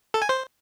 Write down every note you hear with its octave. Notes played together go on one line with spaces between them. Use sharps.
A4
G#5
C5